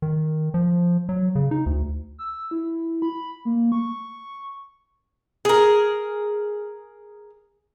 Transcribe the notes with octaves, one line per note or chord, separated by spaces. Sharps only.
D#3
F3
F#3
C#3
D#4
D2
E6
E4
B5
A#3
C#6
G#4 A#4